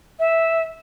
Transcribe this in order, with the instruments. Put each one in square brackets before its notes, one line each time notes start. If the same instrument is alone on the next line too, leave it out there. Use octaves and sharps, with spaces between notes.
[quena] E5